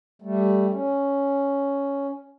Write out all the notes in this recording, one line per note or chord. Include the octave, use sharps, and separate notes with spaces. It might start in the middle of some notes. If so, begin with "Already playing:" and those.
G3 A3
C#4